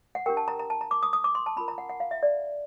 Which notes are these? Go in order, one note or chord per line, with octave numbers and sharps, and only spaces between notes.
F#5
D4 G4 A#4 G5
A5
A#5
A#5
A5
A#5
D6
D#6
D#6
D6
C6
A5
C#4 F4 A#4 B5
A#5
F#5
F#5
F5
E5
D5